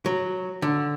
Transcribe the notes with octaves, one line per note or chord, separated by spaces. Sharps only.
F#3
D3